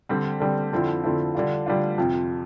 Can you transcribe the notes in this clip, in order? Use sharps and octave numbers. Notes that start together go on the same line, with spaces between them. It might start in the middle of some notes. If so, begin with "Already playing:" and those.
D3 G3 C4
D3 G3 C4
F2 D3 F3 C4 E4
F2 D3 F3 C4 E4
D3 G3 D4 F4
D3 G3 D4 F4
F2 C3 F3